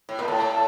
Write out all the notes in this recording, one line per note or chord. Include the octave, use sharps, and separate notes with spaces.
A2
A#2
A2 A4